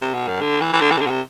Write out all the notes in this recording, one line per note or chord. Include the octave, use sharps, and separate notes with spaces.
C3
B2
F#2
D3
E3
E3
D3
E3
C3
D3
B2
C3